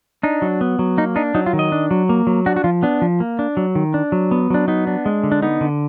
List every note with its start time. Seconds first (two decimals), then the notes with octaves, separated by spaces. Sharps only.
0.23 D4 D#4
0.42 F#3
0.61 B3
0.79 F#3
0.98 A#3 D#4
1.16 D4 D#4
1.35 F#3 D#4
1.46 F4
1.53 D#3
1.59 D#5
1.72 D4
1.91 F#3
2.09 A#3
2.27 F#3
2.46 D4 F#4
2.56 F#4
2.64 F3 F4
2.83 B3 D4
3.02 F3
3.20 A#3
3.39 D4
3.57 F#3
3.75 D#3
3.94 D4
4.12 F#3
4.31 B3
4.50 F#3 D4
4.68 B3 D#4
4.87 D4
5.06 G#3
5.24 D3
5.32 D4
5.42 B3 D#4
5.61 D3